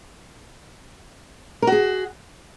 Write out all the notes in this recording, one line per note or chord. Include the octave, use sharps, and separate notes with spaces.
F#4 G#4 A#4